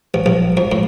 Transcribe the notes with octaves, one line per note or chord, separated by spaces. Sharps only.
A1
A#1
F2
A2